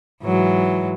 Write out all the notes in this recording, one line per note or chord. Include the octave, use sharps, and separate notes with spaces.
G#2 E3 F#3